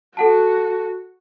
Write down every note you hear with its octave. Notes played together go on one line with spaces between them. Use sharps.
F#4 A4 F#5 A5